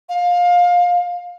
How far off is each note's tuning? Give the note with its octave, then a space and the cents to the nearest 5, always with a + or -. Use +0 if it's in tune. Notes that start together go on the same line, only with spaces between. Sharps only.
F5 +20